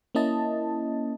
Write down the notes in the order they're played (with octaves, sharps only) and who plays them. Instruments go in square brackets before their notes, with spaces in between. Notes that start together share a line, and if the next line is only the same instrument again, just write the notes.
[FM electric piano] A#3 C#4 E4 D#5 A5